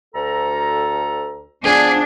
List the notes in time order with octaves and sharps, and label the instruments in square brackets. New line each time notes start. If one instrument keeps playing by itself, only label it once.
[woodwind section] D2 A4 A#5
[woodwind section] F3 B3 [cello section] D4 [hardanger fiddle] G#4